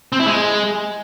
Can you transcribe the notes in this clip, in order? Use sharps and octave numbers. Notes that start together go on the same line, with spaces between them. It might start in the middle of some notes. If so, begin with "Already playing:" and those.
C4
E4
G#3